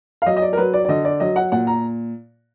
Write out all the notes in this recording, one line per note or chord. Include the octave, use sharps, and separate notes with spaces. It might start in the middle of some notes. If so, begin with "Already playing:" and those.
F5
F#3 D#5
D#5
D5
A#4
F#3 B4
D5
D5
D3 D#5
D5
F#3 D#5
F#5
A#2 F#5
A#5